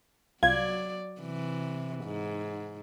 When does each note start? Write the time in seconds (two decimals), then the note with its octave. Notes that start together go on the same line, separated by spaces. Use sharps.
0.43 C2 F#3 F4 D5 G#6
1.20 C3 E3
2.04 G#2